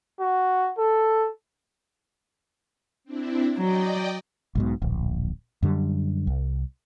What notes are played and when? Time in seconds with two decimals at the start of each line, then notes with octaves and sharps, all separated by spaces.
0.20 F#4
0.78 A4
3.04 C4 D4 E4
3.58 F#3 D5 D#5 G5
4.55 B1 G#2 B2
4.82 D1 A#1
5.63 F#2 D3 G3
6.27 C2